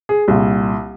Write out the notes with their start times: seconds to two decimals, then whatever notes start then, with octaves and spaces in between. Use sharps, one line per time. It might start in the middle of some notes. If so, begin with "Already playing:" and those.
0.09 G#4
0.28 C2 A#2